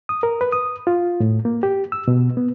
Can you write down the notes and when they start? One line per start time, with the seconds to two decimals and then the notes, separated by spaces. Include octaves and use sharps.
0.09 D#6
0.23 A#4
0.41 B4
0.52 D#6
0.87 F4
1.20 A2
1.45 A#3
1.63 G4
1.92 E6
2.08 B2
2.37 B3